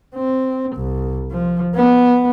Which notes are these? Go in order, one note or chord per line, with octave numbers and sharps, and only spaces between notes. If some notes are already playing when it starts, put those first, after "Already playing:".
C4
C2
F3
B3